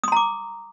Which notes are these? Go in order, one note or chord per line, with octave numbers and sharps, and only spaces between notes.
A#5 C6 D6 D#6